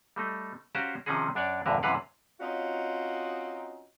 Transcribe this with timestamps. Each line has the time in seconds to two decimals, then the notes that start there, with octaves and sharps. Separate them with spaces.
0.16 G3 A3 D#4
0.75 C#4 F#4 G4 C5 F5 A#5
1.06 C3 D#3 F3 C#4 D#4 G#4
1.35 F#2 D4 C#5 D5
1.66 A#1 E2 G2 D3 A#4 B4
1.83 F#2 C3 E3 B4 F5 F#5
2.40 C4 C#4 D#4 F4 F#4